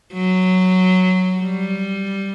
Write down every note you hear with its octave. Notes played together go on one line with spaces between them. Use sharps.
F#3
G3